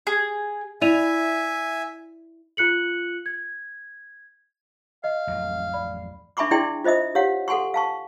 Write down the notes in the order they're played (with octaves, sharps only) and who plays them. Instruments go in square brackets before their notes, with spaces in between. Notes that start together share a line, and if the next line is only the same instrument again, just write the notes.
[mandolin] G#4
[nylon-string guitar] E4 [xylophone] D5 D#7 F7 [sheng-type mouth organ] E5 G#5
[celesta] F4 F#6 C#7 F#7
G#6
[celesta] D#5 [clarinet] F5
[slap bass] A1 F2 F#3
[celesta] D5 B5
[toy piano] D4 E5 G#5 B5 C#6 D6
D4 E4 G#4 D5 G5 C6
F4 C5 D#5 E5 D#6
G4 C#5 F5 F#5
A4 F#5 G#5 C6 C#6
F5 A5 C#6